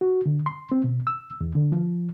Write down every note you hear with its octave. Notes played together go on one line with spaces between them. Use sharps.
F#4
D3
C6
C4
B2
E6
E2
D3
F3